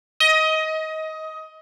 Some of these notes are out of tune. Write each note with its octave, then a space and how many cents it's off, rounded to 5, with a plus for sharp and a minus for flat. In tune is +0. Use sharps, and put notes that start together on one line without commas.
D#5 +20